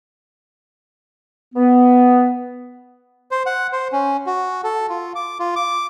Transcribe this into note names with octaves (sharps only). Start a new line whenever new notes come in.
B3
C5
F#5
C5
C#4
F#4
A4
F4
D6
F4
D6